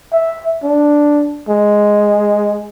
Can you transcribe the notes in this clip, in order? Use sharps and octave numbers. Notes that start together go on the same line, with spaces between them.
E5
D4
G#3